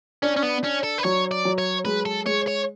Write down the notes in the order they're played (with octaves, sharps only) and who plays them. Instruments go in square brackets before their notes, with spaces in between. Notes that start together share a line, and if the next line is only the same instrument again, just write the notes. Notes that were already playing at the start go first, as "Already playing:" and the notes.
[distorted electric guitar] C#4 [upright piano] D4
[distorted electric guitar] C#4
B3
[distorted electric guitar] C#4 [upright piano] D4
[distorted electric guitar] A4
B4
[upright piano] F#3 [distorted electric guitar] C#5
[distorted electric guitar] D5
[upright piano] F#3
[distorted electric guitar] C#5
[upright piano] G#3 [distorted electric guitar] B4
[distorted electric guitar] A4
[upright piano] G#3 [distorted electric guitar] C#5
[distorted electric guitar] C#5